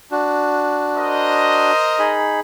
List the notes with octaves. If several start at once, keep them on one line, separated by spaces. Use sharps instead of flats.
D4 F#4
A#4 C5 D#5
D#4 G#4 B5